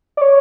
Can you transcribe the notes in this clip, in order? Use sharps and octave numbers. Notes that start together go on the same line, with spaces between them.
D5
C#5